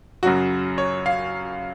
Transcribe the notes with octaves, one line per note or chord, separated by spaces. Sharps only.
F#2 C#3 F#3 F#4
C#5
F5